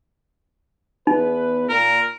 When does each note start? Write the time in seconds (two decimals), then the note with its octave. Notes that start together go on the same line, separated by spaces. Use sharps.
1.07 E2 D#4 B4
1.69 A#2 A#4